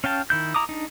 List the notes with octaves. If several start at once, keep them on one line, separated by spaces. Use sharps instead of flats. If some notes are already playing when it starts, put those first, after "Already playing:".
C#4 F5 G5 A5
D#3 E4 G6
E4 A#5 D6 D#6
D4 D#4